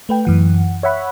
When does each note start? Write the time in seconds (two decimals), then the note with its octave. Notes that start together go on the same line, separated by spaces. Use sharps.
0.09 A3 B4 G5
0.25 F#2 E3 F#5
0.83 C#5 E5 F#5 B5